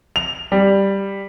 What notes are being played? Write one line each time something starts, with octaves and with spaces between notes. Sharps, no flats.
F7
G3